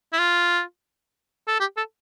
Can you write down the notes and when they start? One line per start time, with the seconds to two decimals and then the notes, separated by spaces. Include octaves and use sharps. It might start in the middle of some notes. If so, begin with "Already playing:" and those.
0.13 E4
0.19 F4
1.47 A4
1.60 G4
1.77 A4